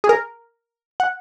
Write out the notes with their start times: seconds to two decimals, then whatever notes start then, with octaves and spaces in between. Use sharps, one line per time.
0.04 G#4
0.09 A#4
1.00 F#5